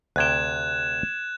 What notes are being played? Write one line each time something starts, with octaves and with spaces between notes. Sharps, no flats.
D2 C3 G5 F#6 G#6 E7